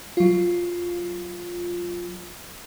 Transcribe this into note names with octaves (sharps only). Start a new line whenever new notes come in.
F#3 F4